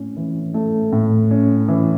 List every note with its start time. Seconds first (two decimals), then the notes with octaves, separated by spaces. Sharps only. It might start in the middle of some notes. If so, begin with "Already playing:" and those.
Already playing: A2 C#4
0.17 E3
0.54 A3
0.92 A2
1.31 C#4
1.68 E3